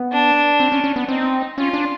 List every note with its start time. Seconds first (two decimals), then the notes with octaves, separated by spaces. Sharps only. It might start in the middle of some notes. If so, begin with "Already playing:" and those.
Already playing: B3
0.12 D4
0.60 C4
0.72 C#4
0.84 C#4
0.96 B3
1.08 C4 D#4
1.57 C#4 F4
1.73 D4